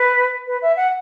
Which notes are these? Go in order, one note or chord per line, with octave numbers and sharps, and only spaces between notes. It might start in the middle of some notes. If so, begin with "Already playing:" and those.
Already playing: B4
B4
E5
F#5